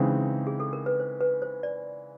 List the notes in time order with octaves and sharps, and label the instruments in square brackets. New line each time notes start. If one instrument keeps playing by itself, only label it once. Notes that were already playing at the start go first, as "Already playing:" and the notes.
Already playing: [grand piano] C#3 E3 G#3 C4 D#4 [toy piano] B4
[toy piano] G#4
A4
A#4
B4
C5
B4
C5
D5